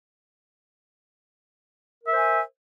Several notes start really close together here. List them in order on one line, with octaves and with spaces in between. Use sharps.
A#4 E5 C5 G#5